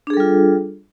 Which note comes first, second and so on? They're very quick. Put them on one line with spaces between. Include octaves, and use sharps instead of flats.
D4 G#4 A4 G3 F4